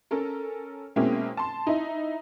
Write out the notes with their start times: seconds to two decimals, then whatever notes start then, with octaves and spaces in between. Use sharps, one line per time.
0.11 C#4 A4 A#4
0.96 B2 G#3 A#3 C4 C#4 E4
1.37 A5 C6
1.67 D#4 E4